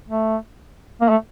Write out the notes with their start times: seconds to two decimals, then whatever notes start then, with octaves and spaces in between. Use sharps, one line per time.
0.09 A3
1.01 A#3
1.09 A3